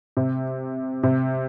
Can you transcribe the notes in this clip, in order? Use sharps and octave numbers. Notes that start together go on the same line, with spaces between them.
C3
C3